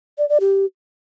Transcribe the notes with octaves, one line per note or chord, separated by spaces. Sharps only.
D5
D5
G4